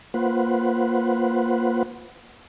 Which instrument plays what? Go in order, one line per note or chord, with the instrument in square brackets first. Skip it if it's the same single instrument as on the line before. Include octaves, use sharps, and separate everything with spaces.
[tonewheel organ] A#3 F4 B4 C5 F#5